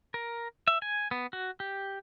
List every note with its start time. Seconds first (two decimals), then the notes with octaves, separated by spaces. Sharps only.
0.14 A#4
0.68 E5
0.82 G#5
1.11 B3
1.33 F#4
1.60 G4